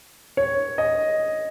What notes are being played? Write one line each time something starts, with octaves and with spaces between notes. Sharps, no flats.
C#5
D#5